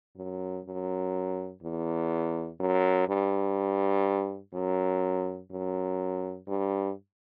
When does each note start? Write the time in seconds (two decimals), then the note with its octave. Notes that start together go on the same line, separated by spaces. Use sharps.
0.17 F#2
0.65 F#2
1.63 E2
2.60 F#2
3.09 G2
4.54 F#2
5.51 F#2
6.48 G2